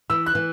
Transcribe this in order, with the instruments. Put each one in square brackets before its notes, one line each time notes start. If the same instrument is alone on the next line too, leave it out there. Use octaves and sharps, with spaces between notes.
[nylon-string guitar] E3 [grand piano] E6
[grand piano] F#6
[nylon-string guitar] E3